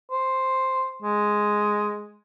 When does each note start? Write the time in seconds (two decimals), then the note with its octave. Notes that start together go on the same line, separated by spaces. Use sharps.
0.11 C5
1.02 G#3